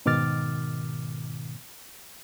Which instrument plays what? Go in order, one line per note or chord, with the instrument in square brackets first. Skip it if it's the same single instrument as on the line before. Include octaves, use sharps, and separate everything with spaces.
[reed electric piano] G#2 B2 D#3 D6 F6 A6